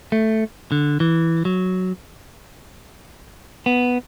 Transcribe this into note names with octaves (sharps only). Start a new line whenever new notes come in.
A3
D3
E3
F#3
B3